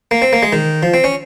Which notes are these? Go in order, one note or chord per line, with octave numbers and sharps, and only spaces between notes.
A#3
C4
A#3
G#3
D#3
F3
C4
C#4